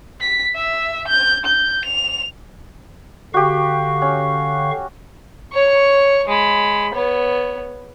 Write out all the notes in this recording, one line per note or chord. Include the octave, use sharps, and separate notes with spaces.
B6
E5
G6
G6
F7
D3 F#4 G4 F5 C#6
C#4
C#5 C#6
G#3 B5
B3 C#5